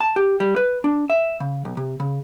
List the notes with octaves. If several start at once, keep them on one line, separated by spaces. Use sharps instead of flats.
A5
G4
G3
B4
D4
E5
C#3
B1
C3
C#3